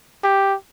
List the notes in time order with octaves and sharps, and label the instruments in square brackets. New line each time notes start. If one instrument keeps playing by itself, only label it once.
[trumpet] G4